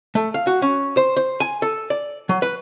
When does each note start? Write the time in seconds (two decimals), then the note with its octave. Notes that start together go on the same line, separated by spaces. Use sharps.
0.15 A3
0.34 F5
0.47 F#4
0.62 C#4
0.97 C5
1.17 C5
1.40 G#5
1.62 A4
1.90 D5
2.29 F#3
2.42 B4